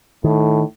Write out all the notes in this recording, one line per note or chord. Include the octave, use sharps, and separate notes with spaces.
A2 D#3